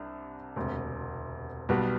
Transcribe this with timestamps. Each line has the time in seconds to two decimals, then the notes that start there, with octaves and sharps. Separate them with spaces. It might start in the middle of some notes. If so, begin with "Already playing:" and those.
Already playing: C2 C3 D4
0.56 E1 D2 C3
1.69 B1 B2 G3 B3 F#4